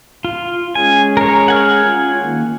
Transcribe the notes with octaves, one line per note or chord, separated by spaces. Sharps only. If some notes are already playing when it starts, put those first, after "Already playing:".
F4
G#3 C#4 G#4 G#5
A#4 C#5
F#5 G#5 F6
C#4 F4
D#3 A#3